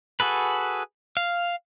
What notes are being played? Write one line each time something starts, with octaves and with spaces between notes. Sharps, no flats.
F#4 G#4 A4 B4
F5